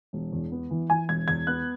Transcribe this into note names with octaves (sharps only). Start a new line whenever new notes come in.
E1
E2
B3
E3
E3 G#5
E1 G#6
E2 G#6
B3 F#6